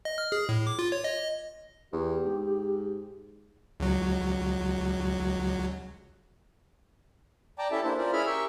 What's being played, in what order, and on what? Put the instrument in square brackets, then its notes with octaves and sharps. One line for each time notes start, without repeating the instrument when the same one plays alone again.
[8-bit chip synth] D#5
F6
G#4
A2
D6
F4
C#5
D#5
[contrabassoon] E2 [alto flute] G4
[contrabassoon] G#2
[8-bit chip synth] C#2 F#3
[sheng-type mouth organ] D5 G5 A5 A#5 D6
C#4 E4 G4 A4 E5 A5
A#3 D4 E4 C5
C#4 F4 A#4 C5 D5
C#4 E4 G#4 E5 B5 F6
G4 A#4 E5 G5 C#6 E6